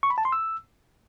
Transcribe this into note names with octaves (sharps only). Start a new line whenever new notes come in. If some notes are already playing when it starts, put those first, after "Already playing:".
C#6
B5
A5
C6
E6